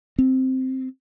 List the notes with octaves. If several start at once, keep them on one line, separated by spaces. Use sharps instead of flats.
C4